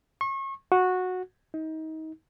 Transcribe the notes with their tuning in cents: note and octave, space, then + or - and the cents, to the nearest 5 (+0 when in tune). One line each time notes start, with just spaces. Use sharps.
C#6 -35
F#4 -10
D#4 +30